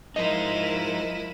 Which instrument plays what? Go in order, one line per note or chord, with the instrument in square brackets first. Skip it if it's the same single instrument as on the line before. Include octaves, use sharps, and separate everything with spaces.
[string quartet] F3 A#4 [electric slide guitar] G#3 D#4 [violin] E4 D#7 [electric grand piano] D#5